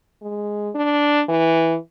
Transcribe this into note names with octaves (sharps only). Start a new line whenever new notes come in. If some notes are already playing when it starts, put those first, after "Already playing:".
G#3
D4
E3